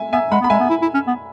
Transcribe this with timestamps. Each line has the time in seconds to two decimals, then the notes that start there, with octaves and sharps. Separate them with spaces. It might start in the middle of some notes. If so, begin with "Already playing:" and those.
Already playing: E5 G#5
0.12 B3 E5 G#5
0.32 G#3 F#5 B5
0.41 B3
0.44 B5
0.50 G#3 E5 G#5
0.60 B3
0.70 E4
0.82 E4
0.94 C#4
1.07 B3